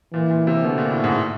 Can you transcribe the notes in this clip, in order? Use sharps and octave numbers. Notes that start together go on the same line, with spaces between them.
A#2 E3
A#2
C3
B2 D3
A#2
A2
G#2